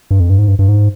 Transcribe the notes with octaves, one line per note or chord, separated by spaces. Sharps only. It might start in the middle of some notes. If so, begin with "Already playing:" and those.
G2
F2
G2
G#2
G2
G2
G#2